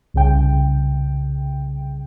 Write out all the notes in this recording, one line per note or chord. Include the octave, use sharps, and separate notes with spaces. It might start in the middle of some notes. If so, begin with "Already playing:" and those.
C2 C#3 G5